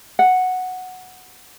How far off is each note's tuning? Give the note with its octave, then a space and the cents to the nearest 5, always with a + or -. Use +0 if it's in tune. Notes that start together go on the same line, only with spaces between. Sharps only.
F#5 -5